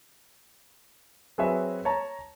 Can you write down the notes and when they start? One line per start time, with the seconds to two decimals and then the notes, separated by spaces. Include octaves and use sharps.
1.38 F#3 C4 G#4 B4 C#5 E5
1.85 C#5 A5 A#5